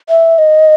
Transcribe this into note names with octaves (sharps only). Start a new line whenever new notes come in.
E5
D#5